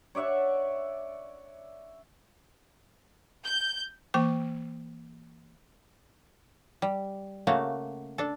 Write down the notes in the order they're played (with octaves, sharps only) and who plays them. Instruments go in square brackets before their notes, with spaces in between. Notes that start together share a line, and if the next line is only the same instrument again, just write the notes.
[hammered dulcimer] C#5 D5 E5 F#5
[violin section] G6
[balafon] E3 A#3 G5 D6
[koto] G3
C#3 A3 A#3 F#4
D4 A4